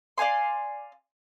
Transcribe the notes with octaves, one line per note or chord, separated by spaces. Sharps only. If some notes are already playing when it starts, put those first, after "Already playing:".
D5 F5 G#5 C6